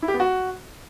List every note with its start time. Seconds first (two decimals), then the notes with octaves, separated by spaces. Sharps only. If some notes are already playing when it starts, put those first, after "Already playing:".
0.02 E4
0.08 G4
0.14 B3
0.20 F#4